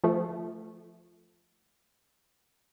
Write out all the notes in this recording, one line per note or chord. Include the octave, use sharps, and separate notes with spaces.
F3 A3